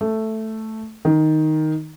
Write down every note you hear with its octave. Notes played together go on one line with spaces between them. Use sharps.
A3
D#3